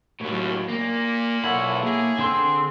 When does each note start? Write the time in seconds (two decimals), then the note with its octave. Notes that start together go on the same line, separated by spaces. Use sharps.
0.20 D#2 A2 F#3
0.69 A#2 A#3
1.44 B1 E4 A4 C#5 F#5
1.82 A#3 G#4
2.19 D3 C4 C6 E6